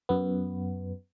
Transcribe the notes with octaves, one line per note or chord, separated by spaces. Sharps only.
F#2 B3